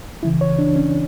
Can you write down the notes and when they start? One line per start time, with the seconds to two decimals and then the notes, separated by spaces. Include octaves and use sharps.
0.23 C#2 C#3 E3 E4
0.41 C#5
0.59 D4
0.76 C#4